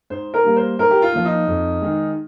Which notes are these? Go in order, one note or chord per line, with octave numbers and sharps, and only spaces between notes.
G#2 C5
A#4
G3 A#3
C5
G#2 A#4
G4
F4
F3 A#3
D#4
F2
D#3 G#3